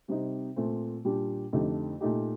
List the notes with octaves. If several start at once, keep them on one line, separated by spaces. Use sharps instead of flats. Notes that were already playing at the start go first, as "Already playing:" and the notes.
C3 G3 C4 D#4
A#2 A3 C4
A#2 G3 D4 G4
F2 D3 A3 D#4 G4
A#2 A3 D#4 G4